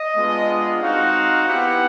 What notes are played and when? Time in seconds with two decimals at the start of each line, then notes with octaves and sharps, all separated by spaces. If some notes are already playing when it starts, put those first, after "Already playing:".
Already playing: D#5
0.15 G#3 B3 D4 F4
0.81 C4 D#4 F#4 F5
1.47 B3 E4 G4 F#5